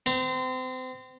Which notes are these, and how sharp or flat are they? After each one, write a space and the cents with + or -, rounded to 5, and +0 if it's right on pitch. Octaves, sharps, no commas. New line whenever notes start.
C4 -30 A#5 -40